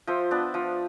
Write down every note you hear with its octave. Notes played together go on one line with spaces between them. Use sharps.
F3 C5 E5
B3 D4
F3